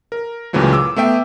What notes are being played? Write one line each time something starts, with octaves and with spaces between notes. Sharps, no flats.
A#4
C#2 A#2 C#3 E3 F#3 A3
D6 E6
A3 B3 E5 G5